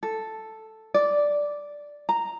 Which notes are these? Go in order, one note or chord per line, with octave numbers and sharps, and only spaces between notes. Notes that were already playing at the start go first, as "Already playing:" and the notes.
A4
D5
A#5